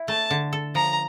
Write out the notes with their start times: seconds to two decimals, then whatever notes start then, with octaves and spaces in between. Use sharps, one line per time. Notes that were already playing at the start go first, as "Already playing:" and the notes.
Already playing: E4
0.08 A3 A5
0.30 D3
0.53 A4
0.75 F3 A#5